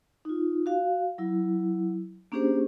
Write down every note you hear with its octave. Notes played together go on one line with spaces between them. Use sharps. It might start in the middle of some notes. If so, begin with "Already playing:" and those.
D#4 F4
F#4 F5
F#3 E4
A#3 C#4 D4 G4 G#4 C5